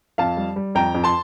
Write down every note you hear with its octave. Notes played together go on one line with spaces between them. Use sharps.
F2 F5 A5
G3
G3
F2 G5 A#5
F2
A5 C6